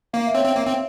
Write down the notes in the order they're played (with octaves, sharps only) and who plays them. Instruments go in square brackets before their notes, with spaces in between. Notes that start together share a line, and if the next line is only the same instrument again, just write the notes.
[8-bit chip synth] A#3 [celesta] F5
[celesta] E5
[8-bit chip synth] C4 [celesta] C#5
[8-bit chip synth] C4
A#3
C4